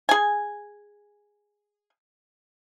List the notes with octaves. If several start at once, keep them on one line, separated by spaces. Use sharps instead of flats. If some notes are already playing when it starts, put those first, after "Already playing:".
G#4 G#5